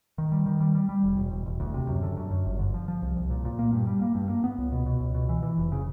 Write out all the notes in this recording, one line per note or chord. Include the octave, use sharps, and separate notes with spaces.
D#3
G3
D#3
G3
G3
G3
E1
E1
E1
E1
D2
C3
F#2
D3
F#2
F#2
G1
D3
F3
F3
C2
C2
A#2
A#2
A#3
G2
G3
A#3
G2
A#3
B3
C#2
B2
B2
C#2
B2
E3
E3
F1
C#3